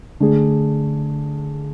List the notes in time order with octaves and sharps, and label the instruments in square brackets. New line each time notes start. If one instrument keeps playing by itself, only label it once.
[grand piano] D3 A3 D4 G#4